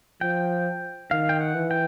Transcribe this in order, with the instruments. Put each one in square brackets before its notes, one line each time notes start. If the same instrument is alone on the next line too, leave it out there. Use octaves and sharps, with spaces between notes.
[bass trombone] F3 [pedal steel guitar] G5
[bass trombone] D#3 [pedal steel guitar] F5
[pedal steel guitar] G5
F#5
[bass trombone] E3
[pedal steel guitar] G5